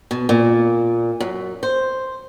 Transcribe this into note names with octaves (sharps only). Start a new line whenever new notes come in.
B2
A#2
F#2
C5